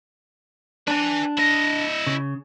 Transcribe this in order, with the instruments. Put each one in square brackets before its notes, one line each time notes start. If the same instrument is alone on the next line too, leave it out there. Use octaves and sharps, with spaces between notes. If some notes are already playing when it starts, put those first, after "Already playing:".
[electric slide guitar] D4 [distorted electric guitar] B4 G#5
[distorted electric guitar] E4 D#5
[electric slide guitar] C#3